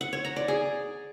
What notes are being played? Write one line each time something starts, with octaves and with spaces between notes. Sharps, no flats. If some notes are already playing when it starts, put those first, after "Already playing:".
F#5
C#5
A#5
D5
G#4